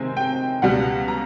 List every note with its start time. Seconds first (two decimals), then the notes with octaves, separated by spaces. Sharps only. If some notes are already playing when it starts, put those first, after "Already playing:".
Already playing: C3 D#3 G#3 C4 G#5
0.17 G5
0.62 C#2 B2 G3 F#5
1.08 A#5